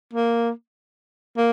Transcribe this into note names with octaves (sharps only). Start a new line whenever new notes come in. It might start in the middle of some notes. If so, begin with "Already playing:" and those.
A#3
A#3